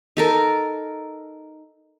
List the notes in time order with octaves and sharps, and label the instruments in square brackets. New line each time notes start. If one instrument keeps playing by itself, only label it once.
[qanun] D#4 A4 A#4